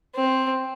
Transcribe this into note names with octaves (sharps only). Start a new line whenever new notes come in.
C4